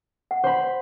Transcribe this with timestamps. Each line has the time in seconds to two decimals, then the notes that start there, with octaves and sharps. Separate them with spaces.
0.31 F#5
0.44 C5 B5